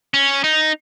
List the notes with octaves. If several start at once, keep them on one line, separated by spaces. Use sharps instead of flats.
C#4
D#4